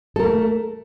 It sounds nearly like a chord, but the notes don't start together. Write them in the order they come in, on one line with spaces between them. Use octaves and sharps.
A4 A#4 A3